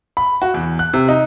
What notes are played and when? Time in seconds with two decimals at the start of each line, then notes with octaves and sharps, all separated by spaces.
0.17 B5
0.42 F#4
0.54 E2
0.79 F#6
0.94 C3
1.08 D#4